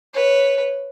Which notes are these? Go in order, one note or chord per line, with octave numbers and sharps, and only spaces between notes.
B4 C#5